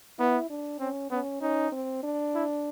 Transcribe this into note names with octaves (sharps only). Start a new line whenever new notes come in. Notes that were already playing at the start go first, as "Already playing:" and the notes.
B3 E4
D4
C4 C#4
B3 C#4
C#4 D#4
C4
D4
E4